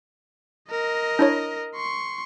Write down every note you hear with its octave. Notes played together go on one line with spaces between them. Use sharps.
A#4 D#5
D4 E4 C#5
C6 C#6